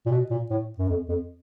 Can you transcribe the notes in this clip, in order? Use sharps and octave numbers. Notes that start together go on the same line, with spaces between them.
A#2
B2
A#2
A2
F#2
F2
F2